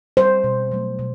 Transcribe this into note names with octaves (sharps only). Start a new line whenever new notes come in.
G3 C5
B2
F#3 A3
B2